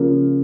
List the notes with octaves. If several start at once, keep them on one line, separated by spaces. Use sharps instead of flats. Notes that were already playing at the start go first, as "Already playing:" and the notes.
Already playing: C#3 F3 A#3